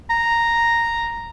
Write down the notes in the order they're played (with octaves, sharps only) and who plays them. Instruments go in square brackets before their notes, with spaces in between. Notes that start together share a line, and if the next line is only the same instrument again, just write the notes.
[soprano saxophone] A#5